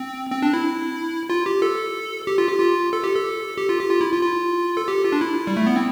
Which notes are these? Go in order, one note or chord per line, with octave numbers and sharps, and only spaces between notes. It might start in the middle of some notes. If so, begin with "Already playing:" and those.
Already playing: C4
C4
D4
E4
F4
G4
A4
G4
F4
G4
F4
A4
G4
A4
G4
F4
G4
F4
E4
F4
F4
A4
G4
F4
D4
E4
G3
A3
B3
C4